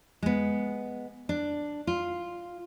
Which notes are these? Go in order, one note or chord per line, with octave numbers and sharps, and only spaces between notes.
G#3 B3
D4
F4